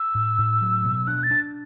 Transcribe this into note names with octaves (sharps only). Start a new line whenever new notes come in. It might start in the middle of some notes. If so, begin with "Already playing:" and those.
Already playing: E6
A2
A2
F#3
B2
D4 F#6
A6
D4